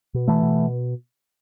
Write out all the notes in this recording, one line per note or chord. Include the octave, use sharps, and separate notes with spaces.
B2
E3 A3
B2